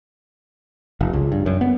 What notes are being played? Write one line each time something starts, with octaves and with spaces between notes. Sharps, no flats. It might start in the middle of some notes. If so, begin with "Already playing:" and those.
F1
C#2
G2
F#2
B3